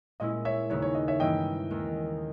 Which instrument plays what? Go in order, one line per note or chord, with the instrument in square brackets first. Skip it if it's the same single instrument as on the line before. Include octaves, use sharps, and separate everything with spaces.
[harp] A#2 G#3 C#4 E4 [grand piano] D#5
[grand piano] C#5 E5
[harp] D#2 C#3 G#3 B3 D#4 [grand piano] C#5
[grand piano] C#5
D#5
C#5 E5
[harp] G2 E3 A#3 C#4 E4 [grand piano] D#5 G5
[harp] D#2 D#3 G#3